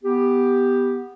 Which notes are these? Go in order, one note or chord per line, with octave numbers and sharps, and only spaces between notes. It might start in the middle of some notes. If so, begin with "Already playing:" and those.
B3 G4